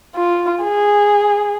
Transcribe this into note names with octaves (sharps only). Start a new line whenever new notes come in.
F4
G#4